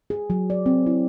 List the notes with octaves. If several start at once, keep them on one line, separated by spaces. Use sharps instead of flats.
G#4
F#3
D5
C4
E4